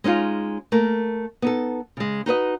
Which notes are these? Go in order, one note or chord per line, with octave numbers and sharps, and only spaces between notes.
G#3 C#4 D#4 F4
A3 A#3 A#4
B3 D#4 A4
C#3 G#3
D#4 F#4 B4 D#5